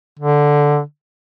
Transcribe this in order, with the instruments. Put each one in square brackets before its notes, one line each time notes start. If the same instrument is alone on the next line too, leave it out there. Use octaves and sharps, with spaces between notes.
[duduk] D3